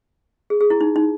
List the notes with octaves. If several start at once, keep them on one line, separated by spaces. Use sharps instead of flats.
G#4
G#4
E4
D#4
D#4